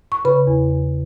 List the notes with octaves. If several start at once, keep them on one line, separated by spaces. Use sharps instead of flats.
C#6
C#3 B4 B5
E2
E2